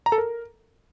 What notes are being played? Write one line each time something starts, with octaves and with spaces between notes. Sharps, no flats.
A#5
A4
A#4